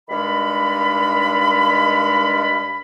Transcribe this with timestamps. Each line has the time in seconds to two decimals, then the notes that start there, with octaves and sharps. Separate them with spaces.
0.09 G2 D#3 G#3 F5 B5